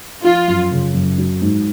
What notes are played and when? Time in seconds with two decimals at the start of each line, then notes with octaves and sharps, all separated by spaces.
0.24 F3 F4
0.48 F#2
0.71 C#3
0.95 F#2
1.18 F#3
1.42 G#2